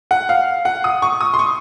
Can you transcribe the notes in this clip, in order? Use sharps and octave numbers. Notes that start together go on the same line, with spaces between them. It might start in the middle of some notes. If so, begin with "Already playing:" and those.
F#5
F5
F#5
D#6
C#6
D#6
C6
C#6